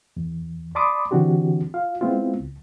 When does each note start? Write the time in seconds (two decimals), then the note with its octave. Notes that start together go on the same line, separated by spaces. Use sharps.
0.17 E2
0.75 D5 A5 B5 C6 D6 D#6
1.11 D3 E3 C4 D4 F#4 G4
1.74 F4 F5
2.01 G#3 B3 C4 E4 F4
2.40 C#2